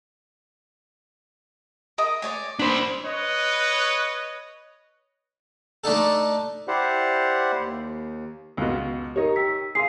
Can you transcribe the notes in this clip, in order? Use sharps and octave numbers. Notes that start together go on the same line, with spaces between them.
A#4 D#5
C#5 D5 G#5
D4 C5 B5
B4 C#5 D#5
A3 D4 D#4 A4
E4 G4 C5 D5 F#5
D#2
C#2 B2
D#4 G4 A#4 C#5
G5 E6 B6
G#4 F5 C6 C7